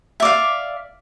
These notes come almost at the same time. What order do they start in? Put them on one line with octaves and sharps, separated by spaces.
E5 D5 F5